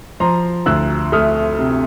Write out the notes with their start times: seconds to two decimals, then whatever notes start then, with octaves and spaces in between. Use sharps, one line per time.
0.20 F3 A#5 C6
0.66 D2 E6 F#6
1.12 A3 D#6 F6
1.59 C3